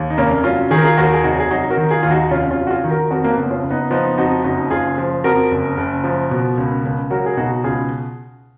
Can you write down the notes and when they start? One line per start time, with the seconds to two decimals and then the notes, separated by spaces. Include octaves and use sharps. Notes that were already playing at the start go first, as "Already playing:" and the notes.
Already playing: D#2
0.10 D#4
0.18 F1 A#3 C#4
0.44 F#3 C#4 F4
0.71 D#3 G#4
0.77 A#4
0.85 F4 G#4
0.97 D#2 F#4 A#4
1.13 G#4
1.24 F1 D#4 F#4
1.40 G#4
1.51 F#3 D#4 F#4
1.70 F#4 A#4
1.77 D#3
1.91 F4 G#4
2.03 D#2 F4
2.11 D#4 F#4
2.31 F1 C#4 F4
2.50 C#4 F4
2.58 F#3
2.67 F#4
2.71 F4 G#4
2.84 D#3
2.91 F#4 A#4
3.10 F2 F#4 A#4
3.24 A#3
3.30 B3
3.37 F#1
3.51 C#4 F4
3.64 F#1
3.71 B3 D#4
3.91 F3 B3 D#4
4.17 F2 D#4 F#4
4.44 F#1 D#4 F#4
4.70 F#1 F4 G#4
4.98 F3
5.24 F2 F#4 A#4
5.51 F#1
5.78 F#1
6.04 F3
6.31 B2
6.57 C#2
6.84 C#2
7.10 F#3 F#4 A#4
7.26 G#4
7.37 B2 D#4 F#4
7.64 C#2 F4 G#4